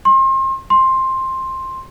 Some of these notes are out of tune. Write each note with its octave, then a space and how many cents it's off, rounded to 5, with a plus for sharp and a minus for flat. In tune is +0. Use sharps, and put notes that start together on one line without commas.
C6 +35
C6 +10